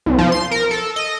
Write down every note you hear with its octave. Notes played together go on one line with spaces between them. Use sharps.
C2
F3
C6
A#4
A4
D#5